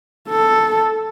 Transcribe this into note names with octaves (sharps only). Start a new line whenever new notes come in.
A4